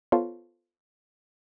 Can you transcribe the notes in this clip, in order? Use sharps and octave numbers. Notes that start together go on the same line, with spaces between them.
B3 F4 A4 C5 C#5